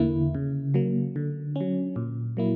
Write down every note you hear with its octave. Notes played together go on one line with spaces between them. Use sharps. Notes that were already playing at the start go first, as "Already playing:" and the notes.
Already playing: E2 D3 A#3 E4
C#3
F#3 A#3
D3
F#3 C#4
A#2
F#3 A#3 E4